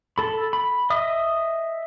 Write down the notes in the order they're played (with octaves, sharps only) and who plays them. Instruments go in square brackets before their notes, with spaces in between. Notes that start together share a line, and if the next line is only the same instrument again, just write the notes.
[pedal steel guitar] A4 B5
B5
D#5 E5 D#6